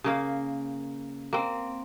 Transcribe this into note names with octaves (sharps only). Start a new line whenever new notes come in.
C#3 A#3 F5
A#3 C4